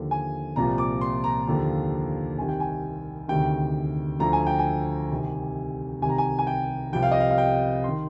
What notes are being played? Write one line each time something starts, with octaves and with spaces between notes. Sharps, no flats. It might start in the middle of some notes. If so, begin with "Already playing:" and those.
Already playing: D#2 D3 F3
G#5
C2 A#2 F3 A#5
D6
C6
A#5
D#2 D3 F3
C2 C3 D#3 G#5
G5
G#5
D2 C3 D#3 G5
D2 D3 F3 A#5
G#5
G5
G#5
C2 C3 D#3
C2 C3 D#3 G#5
A#5
G#5
G#5
G5
C2 C3 F3 G5
F5
D#5
F5
F5
G5
D#3 C6